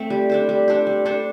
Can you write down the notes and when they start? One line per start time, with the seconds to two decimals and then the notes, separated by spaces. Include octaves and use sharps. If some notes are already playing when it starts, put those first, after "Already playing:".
Already playing: A3 C4
0.10 G3
0.30 D4 A4 C5
0.49 G3
0.68 D4 A4 C5
0.87 G3
1.05 D4 A4 C5